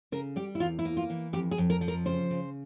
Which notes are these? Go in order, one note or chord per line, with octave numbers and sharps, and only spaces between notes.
C#3 A#4
G3 G4
E4
E2 F4
E4
A#3
F4
E3
F2 G4
G#4
F2
A#4
F3
A#4
C#3 C5
C#3